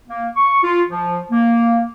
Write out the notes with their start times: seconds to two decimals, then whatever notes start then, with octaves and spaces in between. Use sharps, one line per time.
0.09 A#3
0.36 C#6
0.63 F4
0.89 F3
1.31 A#3